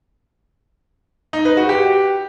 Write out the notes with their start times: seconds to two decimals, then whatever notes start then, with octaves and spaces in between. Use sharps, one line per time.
1.33 D#4
1.45 B4
1.57 F#4
1.69 G4